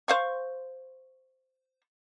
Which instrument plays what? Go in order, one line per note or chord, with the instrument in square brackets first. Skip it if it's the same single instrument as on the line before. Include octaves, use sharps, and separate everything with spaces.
[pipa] C5 F5 C#6